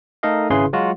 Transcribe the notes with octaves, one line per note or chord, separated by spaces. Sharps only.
A3 D#4 A4 A#4 D#5 F5
G#1 C#3 E4 G#4 B4 C6
F#3 G#3 F4 F#4